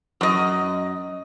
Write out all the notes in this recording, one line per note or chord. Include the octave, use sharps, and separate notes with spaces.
F#2 D#5